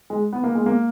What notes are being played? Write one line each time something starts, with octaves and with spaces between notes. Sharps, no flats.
G#3
B3
A#3
G#3
A#3